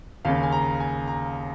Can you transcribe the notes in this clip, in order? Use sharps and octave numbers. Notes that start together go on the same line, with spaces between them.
D#2 C#3 F5
G#5
A#5
G#5
A#5